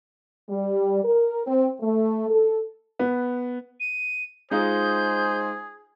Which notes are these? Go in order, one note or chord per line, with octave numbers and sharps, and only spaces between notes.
G3
A#4
C4
A3
A4
B3
D#7
G#3 D#4 F4 G#4 C5 G6